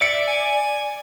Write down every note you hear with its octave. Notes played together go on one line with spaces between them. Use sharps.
D5 E5 C#7 D7
G#5